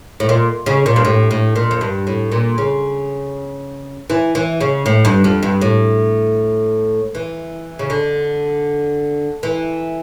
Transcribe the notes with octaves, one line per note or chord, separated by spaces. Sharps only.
A2
A#2
C#3
A#2
G2
A2
A2
A#2
F2
G2
A2
A#2
C#3
E3
E3
C#3
A2
G2
F2
G2
A2
E3
C#3
D3
E3